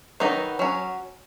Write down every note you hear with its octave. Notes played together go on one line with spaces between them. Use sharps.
D#3 F#3 B3 D#4
F#3 C#4